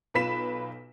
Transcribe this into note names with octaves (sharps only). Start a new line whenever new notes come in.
B1 F4 B4 B5 B6 E7